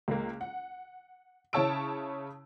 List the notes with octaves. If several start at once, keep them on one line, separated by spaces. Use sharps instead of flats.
C#2 G#3 A#3
F#5
C#3 E4 C#5 A5 E6 D7